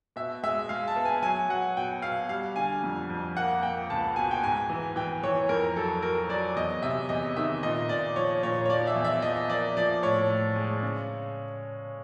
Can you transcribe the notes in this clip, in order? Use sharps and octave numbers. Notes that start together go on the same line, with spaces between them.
B2 E5
G#3 E5
G#3 F5
A5
B3
G#5
F#3 G#5
F#3 F#5
B2 G5
B2 F5
G3 F5
D3 G#5
F2
F2
A#3 F#5
A#3 G5
C#2 A5
B2 G#5
G5
G#2 G#5
E3
E3 G5
E3 C#5
F2 A#4
F#3 A4
F#3 A#4
F#3 D5
E2 D#5
C3 E5
E2 D#5
D#3 E5
A#2 D#5
A#2 D5
F3 C#5
A#2 C#5
C#5
F3 D5
E5
E2
E5
F3 D#5
A#3 D5
F3 D5
A2 C#5
A2
G#3
C#3